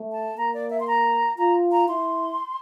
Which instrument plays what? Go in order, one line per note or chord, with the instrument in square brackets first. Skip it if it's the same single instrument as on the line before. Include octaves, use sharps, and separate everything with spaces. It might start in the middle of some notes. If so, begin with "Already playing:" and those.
Already playing: [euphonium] A3
[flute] A5
[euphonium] A#3 [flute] A#5
[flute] D5
E5
C6
A#5
[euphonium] F4 [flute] A#5
[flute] A#5
[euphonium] E4 [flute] C6